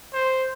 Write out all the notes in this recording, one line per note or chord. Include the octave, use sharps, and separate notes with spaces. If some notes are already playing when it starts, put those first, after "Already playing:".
C5